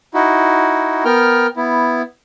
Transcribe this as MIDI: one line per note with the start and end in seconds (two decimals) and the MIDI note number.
0.14 1.04 63
0.14 1.04 64
0.14 1.04 66
1.05 1.47 59
1.05 1.47 70
1.05 1.47 79
1.05 1.47 89
1.56 2.02 59
1.56 2.02 64